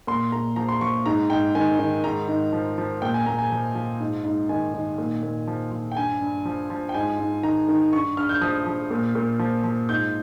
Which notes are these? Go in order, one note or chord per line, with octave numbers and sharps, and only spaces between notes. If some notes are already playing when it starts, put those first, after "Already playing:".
A#2 C6
A#2 A#5
F3 A#5
C6
F3 C#6
G#2 A#5
G#2 G5
D#3 G#5
D#3
G#2 A#5
G#2
F3
F3
A#2 G5
G#5
A#2 A#5
G#5
F3
F3
G#2
G#2
D#3 G#5
D#3
A#2
A#2
F3
F3
G5
G2 G#5
G2
F3
F3
G5
G#2 G#5
G#2
D#3 A#5
D#3
G2 C#6
G2 F6
G6
F3 D#6
F3
A#2
A#2
F3
F3
G#2 G6